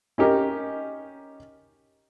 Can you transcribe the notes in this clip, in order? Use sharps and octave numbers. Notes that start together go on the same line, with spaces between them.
C#4 D#4 G4 A#4